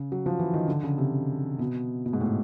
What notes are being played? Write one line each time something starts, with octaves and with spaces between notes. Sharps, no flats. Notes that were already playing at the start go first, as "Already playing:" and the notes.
Already playing: C#3
F#3
F3
E3
D#3
D3
C#3
C3
B2
B2
G#2
A2